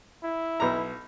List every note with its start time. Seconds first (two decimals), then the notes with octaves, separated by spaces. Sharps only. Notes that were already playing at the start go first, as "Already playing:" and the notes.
0.23 E4
0.60 B1 A#5